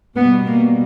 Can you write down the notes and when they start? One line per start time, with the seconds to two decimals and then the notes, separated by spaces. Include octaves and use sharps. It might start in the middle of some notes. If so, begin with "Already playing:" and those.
0.17 B2 G3 B3
0.46 A#3